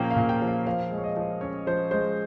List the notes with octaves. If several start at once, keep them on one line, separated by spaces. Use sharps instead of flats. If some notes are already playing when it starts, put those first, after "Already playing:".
Already playing: A#2 F3 A#3 C#4 A#4 G5
F5
A#2
G5
F3
F5
F3 F5
G#3
C#5
D#5
F3
C#4 C#5
F3 C5
G#3 C5